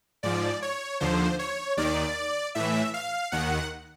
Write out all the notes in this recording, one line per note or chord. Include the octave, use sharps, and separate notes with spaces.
G#2 F3 D5
C#5
D#2 D3 F3 C5
C#5
D#2 D#3 D5
A2 E3 E5
F5
D#2 D#3 F#5